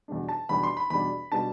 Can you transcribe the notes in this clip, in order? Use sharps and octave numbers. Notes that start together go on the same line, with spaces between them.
E2 B2 G3 D4
A5
E2 B2 G3 D4 B5
C6
B5
E2 B2 G3 D4 B5
B2 G3 D4 A5